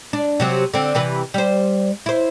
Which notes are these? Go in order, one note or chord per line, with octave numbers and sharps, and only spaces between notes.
D4
C3 F#3 C4
D3 C4
C3 E3 B4
G3 C5
E4 C5